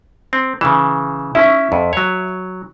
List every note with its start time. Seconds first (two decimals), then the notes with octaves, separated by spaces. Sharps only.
0.33 C4
0.61 C#3 E3 E7
1.35 C#4 E4 E5 C#6
1.72 F2
1.93 F#3 C#5